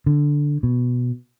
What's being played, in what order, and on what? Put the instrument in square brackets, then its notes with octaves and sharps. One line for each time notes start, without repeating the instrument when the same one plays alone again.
[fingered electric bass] D3
B2